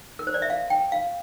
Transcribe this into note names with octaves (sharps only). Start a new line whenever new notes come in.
A#4
C5
D5
E5
F5
G5
F5